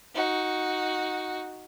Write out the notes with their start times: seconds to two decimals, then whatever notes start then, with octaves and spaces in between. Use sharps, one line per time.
0.15 D#4 F#4